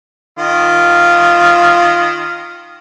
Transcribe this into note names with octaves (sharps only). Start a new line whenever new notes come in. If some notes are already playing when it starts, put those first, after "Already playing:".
D#3 F4